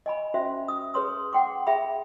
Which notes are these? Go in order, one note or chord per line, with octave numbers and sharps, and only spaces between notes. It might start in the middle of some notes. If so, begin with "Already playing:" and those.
D#5 G#5 B5
C#4 F#4 C5 E5
D#6
G#4 B4 C#5 C6 D#6
F#5 G5 C6 D6
G#4 E5 G5 B5